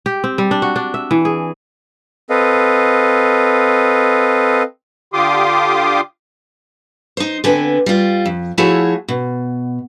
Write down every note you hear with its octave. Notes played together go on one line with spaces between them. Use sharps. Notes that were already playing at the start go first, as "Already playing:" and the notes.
G4
C4
G3
D4
F#4
D4
E5
E3
G#4
C4 A4 B4 D#5 F5
D3 F4 G4 C6 D6 D#6
D#4 C5
D3 B3 C4 B4 G#5
G3 F4
F2
F3 A3 E4 F#4 G#4 C#5
B2